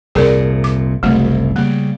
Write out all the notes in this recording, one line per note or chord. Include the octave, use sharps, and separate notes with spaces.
C2 F2 A#2 G#4 A#4 D5
D6
F#1 C2 F#2 A3
C#3 G3 A#3